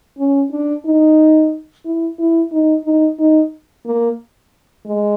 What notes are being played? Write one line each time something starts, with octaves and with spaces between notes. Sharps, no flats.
C#4
D4
D#4
E4
E4
D#4
D#4
D#4
A#3
G#3